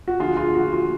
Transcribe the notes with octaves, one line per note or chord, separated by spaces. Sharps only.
F#4
D2 D3 F3 F4 G#4
F4
F#4
F4